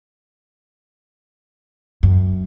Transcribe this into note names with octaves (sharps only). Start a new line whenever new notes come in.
F#2